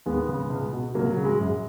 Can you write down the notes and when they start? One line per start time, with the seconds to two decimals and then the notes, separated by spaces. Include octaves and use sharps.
0.06 D#2 G#3 B3
0.29 C#3
0.50 C#2
0.73 B2
0.95 C#2 F#3 A#3
1.10 F#3
1.17 C#3
1.25 G#3
1.40 F#2 G#3